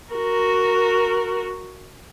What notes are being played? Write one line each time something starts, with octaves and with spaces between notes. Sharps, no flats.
F#4 A#4